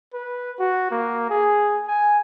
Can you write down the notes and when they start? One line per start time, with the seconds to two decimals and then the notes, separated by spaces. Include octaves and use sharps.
0.14 B4
0.60 F#4
0.91 A#3
1.30 G#4
1.88 G#5